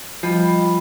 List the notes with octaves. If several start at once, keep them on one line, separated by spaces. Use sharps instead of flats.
F3 G3 D#5 B5